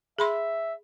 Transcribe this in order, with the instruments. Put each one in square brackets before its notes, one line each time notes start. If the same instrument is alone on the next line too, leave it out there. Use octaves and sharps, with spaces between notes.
[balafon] G#4 B5 C6 [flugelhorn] E5